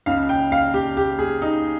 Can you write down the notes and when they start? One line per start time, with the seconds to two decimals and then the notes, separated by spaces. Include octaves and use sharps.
0.06 C#2 C#3 F5
0.29 G5
0.52 F5
0.74 G4
0.97 G4
1.19 G#4
1.42 D#4